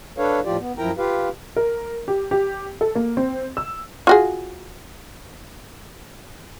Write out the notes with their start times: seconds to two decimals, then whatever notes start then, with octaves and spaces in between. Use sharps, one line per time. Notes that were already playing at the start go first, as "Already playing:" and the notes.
0.18 D4 A4 B4 C#5 F5
0.45 A2 F3 F4 G4 D5
0.59 B3
0.78 F#2 F3 E4 A#4 G5 A#5
0.98 F4 G4 B4 F5
1.57 A#4
2.08 G4
2.31 G4
2.81 A4
2.95 A#3
3.17 C4
3.57 E6
4.07 F4 F#4 G#4